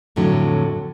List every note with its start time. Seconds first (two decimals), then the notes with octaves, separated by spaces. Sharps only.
0.16 F2 A2 D3 F#3 A3